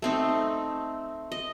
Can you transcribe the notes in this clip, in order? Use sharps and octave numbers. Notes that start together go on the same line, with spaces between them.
A3 C4 D#4
D#5